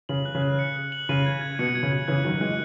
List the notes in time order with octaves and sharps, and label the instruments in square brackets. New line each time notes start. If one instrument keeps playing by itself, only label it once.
[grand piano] C#3 [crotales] F#7
[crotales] F#6
[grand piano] C#3
[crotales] F#6
C#7
F#6
F#7
[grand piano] C#3 [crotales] D#7
[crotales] G#6
G#6
[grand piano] B2 [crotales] C#7
[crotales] G#6
[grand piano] C#3
[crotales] G#6
[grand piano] C#3 E3 [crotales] F#6
[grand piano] D#3 F#3 [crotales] F#6
[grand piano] E3 G#3 [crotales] F#6